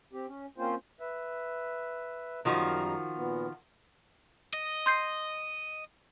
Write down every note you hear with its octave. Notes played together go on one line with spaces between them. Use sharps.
C4 G4
C#4
A#3 C4 C#4 F4 C5
B4 E5
F#2 D#3 F3 G3 F#4 A#5
A#2 B3
D#5
C6 G6 C7